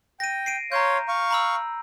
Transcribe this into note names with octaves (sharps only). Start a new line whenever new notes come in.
G5 A#6 D#7
C7 D7 D#7
C#5 F5 A#5 C6 G6
F5 C#6
A#5 B5 E6